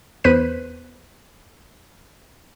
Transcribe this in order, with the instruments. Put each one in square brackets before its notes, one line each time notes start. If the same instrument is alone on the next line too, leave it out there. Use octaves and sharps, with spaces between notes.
[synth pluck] E2 B4 C5 F#6 B6 D#7